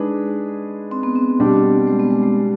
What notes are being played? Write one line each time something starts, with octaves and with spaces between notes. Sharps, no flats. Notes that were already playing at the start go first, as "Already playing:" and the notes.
Already playing: G#3 D4 D#4 G#4 B4
C4
B3
C4
B2 G3 D4 G4
G#3
B3
G#3
G#3